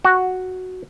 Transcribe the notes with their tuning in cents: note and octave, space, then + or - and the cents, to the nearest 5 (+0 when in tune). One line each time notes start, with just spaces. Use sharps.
F#4 +0